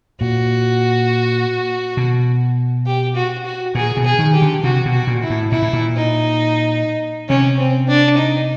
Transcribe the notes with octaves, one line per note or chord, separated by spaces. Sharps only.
A#2 F#4
B2
G4
F#4
F#4
A#2 G#4
B2
G#4
D#3
G4
D3
C3 F#4
B2
F#4
A#2
E4
A2
A#2 E4
A2
A#2
D#4
C3 C#4
C4
D4
D#4